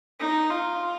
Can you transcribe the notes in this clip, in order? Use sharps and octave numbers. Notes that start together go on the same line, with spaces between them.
D#4
F4